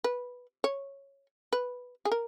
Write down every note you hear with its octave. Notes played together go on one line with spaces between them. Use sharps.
B4
C#5
B4
G#4
A#4